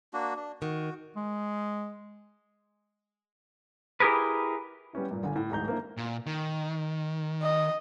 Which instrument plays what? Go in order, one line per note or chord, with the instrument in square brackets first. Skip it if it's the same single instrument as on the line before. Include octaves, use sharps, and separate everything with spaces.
[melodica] A#3 D4 F#4
D4
[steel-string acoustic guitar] D#3 [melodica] F#4
[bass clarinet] G#3
[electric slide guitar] E4 G4 G#4 A#4 B4
[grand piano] G3 B3 C#4 E4
G2 A#2
G1 D3 G#5
A2
D1 G#2 E3 A#5 G6
A#3 C4 D4 E4
[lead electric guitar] A#2
D#3
[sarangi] D#5